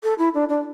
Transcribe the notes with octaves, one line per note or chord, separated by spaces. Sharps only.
A4
E4
D4
D4